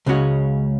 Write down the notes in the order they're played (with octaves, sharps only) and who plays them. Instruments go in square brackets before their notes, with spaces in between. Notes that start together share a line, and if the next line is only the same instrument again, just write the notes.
[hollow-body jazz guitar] C#2 C#3 G#3 C#4 F#4